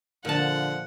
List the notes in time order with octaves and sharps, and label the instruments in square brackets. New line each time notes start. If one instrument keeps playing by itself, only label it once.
[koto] A#2 A5 [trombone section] D3 [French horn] F3 [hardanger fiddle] F#5